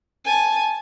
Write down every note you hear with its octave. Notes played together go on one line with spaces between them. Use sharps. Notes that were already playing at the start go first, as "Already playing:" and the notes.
G#5 A5